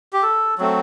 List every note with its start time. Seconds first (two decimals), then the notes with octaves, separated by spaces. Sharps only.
0.13 G4
0.23 A4
0.58 F#3 A3 C4